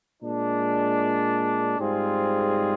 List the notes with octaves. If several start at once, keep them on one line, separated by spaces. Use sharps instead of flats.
A#2 G#3 D4
G#2 G3 C4 F4 G#4